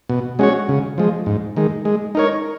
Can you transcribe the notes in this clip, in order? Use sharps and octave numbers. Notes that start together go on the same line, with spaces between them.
B2
G#3 C#4 F#4 C#5
C#3
F3 G#3
G#2
D#3 G#3
G#3
D#4 A#4 C#5